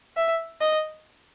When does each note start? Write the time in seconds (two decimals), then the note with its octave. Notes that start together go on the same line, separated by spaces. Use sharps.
0.17 E5
0.61 D#5